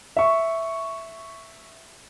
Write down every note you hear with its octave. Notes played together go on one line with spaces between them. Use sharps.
E5 C#6